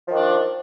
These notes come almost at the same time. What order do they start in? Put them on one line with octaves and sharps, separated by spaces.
F3 D#3 D4